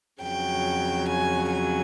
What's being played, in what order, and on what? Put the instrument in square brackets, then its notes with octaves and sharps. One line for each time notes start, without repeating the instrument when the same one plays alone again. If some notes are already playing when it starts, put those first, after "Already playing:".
[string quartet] F2 C#3 F#3 G5
G#5
G#5